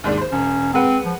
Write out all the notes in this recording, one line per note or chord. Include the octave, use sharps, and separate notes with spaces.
D#2 G#2 D4
C5 C6
E1 C#4
G#3 C4 B4 F#5
F3